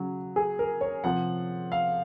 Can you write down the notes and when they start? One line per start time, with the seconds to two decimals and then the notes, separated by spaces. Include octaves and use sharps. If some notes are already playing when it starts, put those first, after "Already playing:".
Already playing: C#3 F#3
0.36 G#4
0.59 A#4
0.81 C#5
1.04 C3 F3 F#5
1.72 F5